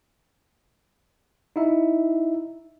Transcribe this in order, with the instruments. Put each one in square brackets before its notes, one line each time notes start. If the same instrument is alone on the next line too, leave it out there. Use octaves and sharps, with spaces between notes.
[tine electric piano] D#4 E4 E5